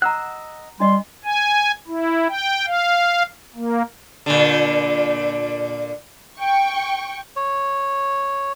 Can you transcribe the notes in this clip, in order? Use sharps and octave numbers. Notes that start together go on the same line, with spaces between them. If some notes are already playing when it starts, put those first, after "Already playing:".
D#5 F#5 A#5 E6 F#6
G3 D4 D#5 C6
G#5
E4
G5
F5
A#3
A#2 D3
G5 C#6
C#5